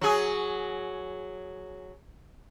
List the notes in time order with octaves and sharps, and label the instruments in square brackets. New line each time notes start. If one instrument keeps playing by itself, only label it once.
[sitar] F#3 G#4